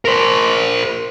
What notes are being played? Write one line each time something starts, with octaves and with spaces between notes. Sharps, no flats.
A#4 C5